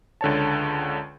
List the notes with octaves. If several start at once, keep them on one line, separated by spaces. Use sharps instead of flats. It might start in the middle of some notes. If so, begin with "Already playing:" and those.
C#2 D3 C#5 A5